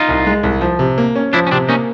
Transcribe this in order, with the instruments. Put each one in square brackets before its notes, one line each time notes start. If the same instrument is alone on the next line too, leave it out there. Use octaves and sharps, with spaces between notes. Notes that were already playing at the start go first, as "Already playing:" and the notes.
Already playing: [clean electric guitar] D#4 F4
[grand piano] C2
G#3
C2
F3
C3
A#3
C#4
[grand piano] F3 [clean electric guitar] D4 E4
[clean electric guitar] C#4
[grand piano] C3 [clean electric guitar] C4 D4
[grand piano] A#3 [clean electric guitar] C#4 D#4